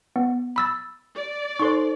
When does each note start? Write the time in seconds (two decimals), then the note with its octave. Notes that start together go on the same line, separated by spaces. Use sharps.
0.16 B3
0.56 B5 E6 A6
1.14 D5
1.59 D#4 A4 C5 C6 C#6